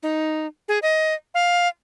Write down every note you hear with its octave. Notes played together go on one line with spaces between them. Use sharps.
D#4
G#4
D#5
F5